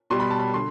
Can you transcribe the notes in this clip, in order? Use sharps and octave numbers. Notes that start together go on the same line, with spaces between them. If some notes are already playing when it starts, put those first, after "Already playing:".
B2 G3 C6
B5
A5
B5
D3 C6